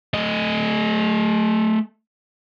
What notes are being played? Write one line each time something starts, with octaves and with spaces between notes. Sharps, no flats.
A3 D#5